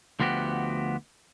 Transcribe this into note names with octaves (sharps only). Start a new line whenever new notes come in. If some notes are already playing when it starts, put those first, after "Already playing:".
D2 F3 B3 F#4 G4